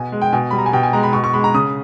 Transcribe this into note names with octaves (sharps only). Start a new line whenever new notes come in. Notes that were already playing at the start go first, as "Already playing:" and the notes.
Already playing: B2 G#5
G#3
G5
B2 G#5
G3 B5
A#5
G#5
B2 G5
G#5
G#3 A#5
B5
B2 C#6
C#6
G#3 B5
A#5
C#3 D#6